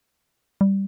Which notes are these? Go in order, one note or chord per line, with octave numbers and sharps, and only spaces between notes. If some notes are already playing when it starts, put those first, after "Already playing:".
G3